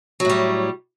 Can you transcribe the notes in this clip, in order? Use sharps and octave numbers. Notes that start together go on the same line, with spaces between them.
A2 F#3 G3